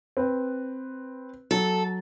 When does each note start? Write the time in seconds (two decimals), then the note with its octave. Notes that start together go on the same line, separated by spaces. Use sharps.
0.17 C4 B4
1.51 F#3 A4